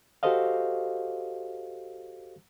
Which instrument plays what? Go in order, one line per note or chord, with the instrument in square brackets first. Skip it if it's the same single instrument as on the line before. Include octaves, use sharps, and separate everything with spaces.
[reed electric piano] F#4 G4 A4 C5 D#5 F5